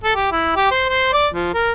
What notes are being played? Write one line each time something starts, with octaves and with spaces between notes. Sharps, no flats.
A4
G4
E4
G4
C5
C5
D5
F3
A#4